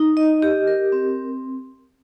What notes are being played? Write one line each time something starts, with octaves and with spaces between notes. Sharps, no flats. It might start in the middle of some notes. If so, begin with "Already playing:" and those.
Already playing: D#4
D#5
G4
A#4
C4